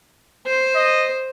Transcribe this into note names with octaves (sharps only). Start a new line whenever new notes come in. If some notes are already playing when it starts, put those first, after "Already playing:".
C5
D#5